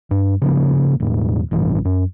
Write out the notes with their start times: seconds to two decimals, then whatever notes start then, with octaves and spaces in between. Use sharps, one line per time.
0.11 G2
0.42 C#3 F3 A#3
1.00 E1 E2 A2
1.51 A1 G2 C3 E3
1.85 F#2